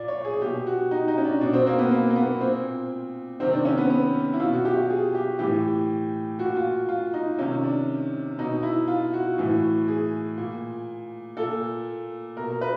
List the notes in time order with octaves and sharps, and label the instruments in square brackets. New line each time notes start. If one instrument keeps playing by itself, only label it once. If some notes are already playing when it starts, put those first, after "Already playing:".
Already playing: [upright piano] A#2 D5
C#5
G#4
B2 G4
F#4
D#4
D#4
C#4
D4
B2 D4
C4
A#3
B3
A#3
A#3
B3
A#2 C4
C3 D#3 C4
D4
C#4
B3
B3
E4
B2 F4
F#4
G4
G4
G#4
G4
A2 E3 G4
A#2 F#4
F4
F4
D#4
C3 D#3 C#4
D4
B2 D#4
E4
F4
F#4
A2 E3
G#4
A#2
A#2 A4
B2 A#4
B4